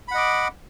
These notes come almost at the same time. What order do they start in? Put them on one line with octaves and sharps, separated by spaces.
B5 F#5 D#5 D6